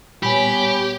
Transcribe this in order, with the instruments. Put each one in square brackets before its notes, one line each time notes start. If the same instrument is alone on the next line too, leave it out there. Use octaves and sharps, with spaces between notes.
[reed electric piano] A#2 G3 G#5 [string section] B3 C#5 [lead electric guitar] G4 [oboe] B5